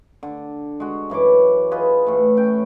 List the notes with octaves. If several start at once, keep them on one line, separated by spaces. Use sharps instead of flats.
D3
G#3 F#4
F#2 E3 C#5 D6
F4 G#4 B4 D#5
A2 E3 A3
C#4 G5